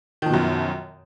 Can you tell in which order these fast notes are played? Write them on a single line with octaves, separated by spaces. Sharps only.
D#3 F3 B2 F#2